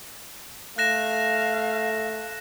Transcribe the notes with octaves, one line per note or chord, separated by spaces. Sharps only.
A3 F5 F#6 A#6 E7